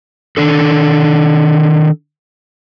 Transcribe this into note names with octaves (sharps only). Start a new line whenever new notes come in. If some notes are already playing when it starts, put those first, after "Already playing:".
D#3 D4 A4